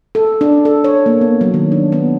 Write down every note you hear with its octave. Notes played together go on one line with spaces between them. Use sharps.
A4
D4
A4
C#5
A#3
B3
F#3
D#3
D4
B3